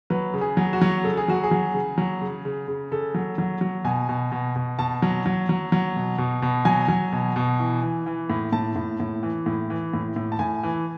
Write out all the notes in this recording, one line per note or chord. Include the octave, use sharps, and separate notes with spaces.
F#3 B4
C#3
G#4
F#3
F#4
F#3
C#3 A4
G#4
F#3 F#4
G#4
F#3
C#3
F#3
C#3
C#3
C#3
C#3 A4
F#3
F#3
F#3
B2 G#5
B2
B2
B2
B2 A5
F#3
F#3
F#3
F#3
B2
B2
B2
F#3 G#5
F#3
B2
B2
E3
E3
E3
A2
A2 A5
A2
A2
E3
A2
E3
A2
A2
A5
A2 G#5
E3